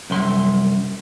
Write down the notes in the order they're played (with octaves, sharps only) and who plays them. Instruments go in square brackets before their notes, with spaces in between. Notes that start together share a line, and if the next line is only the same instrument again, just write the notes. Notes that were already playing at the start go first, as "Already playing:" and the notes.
[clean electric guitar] C2 F#2 C6